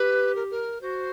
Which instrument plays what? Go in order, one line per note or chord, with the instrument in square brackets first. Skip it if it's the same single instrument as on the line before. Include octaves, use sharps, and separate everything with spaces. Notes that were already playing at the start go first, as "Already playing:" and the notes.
Already playing: [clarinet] G4 [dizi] B4
[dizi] A#4
A#4
[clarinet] F#4 [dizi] C5